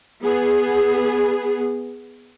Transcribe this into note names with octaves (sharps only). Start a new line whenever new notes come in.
B3 G#4